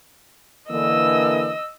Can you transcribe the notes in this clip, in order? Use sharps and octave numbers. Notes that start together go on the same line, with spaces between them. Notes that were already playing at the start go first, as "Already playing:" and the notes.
D3 E3 A#3 D#5 E6